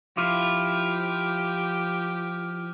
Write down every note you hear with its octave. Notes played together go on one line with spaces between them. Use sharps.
F3 E4 F4 G4 D6 F6 D#7